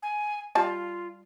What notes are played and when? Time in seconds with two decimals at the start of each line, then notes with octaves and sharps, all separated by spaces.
0.03 G#5
0.55 G3 F4 A5